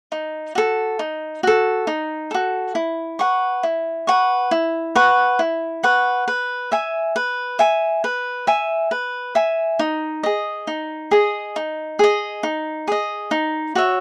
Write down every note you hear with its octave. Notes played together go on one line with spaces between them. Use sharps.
D#4
F#4 A4
D#4
F#4 A4
D#4
F#4 A4
E4
B4 F#5 C#6
E4
B4 F#5 C#6
E4
B4 F#5 C#6
E4
B4 F#5 C#6
B4
E5 G#5
B4
E5 G#5
B4
E5 G#5
B4
E5 G#5
D#4
G#4 D#5
D#4
G#4 D#5
D#4
G#4 D#5
D#4
G#4 D#5
D#4
F#4 C#5 E5